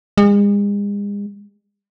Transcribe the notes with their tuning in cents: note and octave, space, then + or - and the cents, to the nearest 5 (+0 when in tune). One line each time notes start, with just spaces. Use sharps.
G#3 -40